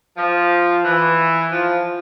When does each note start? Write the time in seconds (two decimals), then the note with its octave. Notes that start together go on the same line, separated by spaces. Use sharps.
0.17 F3
0.85 E3
1.52 F3